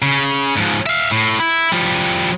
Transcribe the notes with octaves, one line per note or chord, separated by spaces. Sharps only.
C#3
G#2 F3
E5 F5
A2
E4
F3 G3